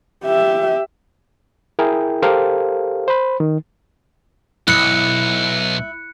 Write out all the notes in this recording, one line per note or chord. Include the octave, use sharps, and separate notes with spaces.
G4 E5
E4 G#4 A#4 G5
G4 A4 A#4 C5 F5
C5 B5
D#3
B1 E4 F#6 C#7